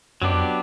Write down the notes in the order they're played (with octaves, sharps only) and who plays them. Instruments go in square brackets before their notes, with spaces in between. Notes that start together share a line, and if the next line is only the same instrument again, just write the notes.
[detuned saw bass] F#2 [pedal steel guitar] F#3 B3 D4 G4
[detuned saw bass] F2